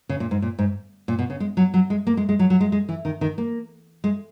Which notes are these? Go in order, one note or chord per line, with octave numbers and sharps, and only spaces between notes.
C#3
A#2
G#2
A#2
G#2
A#2
B2
C#3
G#3
F#3
F#3
G#3
A#3
G#3
G#3
F#3
F#3
G#3
G#3
E3
D#3
D#3
A#3
G#3